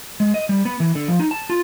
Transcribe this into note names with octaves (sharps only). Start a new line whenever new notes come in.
G#3
D#5
G3
B3
E3
D3
F3
D#4
A5
F4